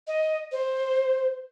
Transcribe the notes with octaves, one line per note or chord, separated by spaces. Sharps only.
D#5
C5